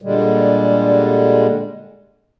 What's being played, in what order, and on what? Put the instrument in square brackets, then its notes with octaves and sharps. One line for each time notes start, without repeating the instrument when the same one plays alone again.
[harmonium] A#2 D3 G3 G#3